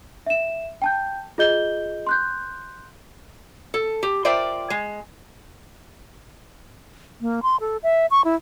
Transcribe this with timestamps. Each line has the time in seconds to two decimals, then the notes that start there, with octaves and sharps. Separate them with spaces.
0.26 E5 E7
0.82 G5 A5 G6
1.38 F4 G#4 D#5 G6 G7
2.07 C6 F#6 G6
3.74 A4
4.03 G4
4.25 F4 A#4 C5 D5 E5 G5
4.70 G#3
7.21 A#3
7.43 C6
7.60 A4
7.83 E5
8.11 C#6
8.24 E4